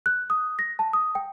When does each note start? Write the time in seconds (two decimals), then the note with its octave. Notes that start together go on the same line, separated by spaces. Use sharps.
0.06 F#6
0.30 D#6
0.59 A#6
0.79 A5
0.93 D#6
1.15 G5